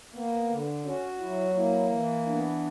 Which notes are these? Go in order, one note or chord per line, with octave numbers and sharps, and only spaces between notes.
A#3 B3
D3
C#4 F#4
F#3 E4
A#3 E4
E3
B3 D4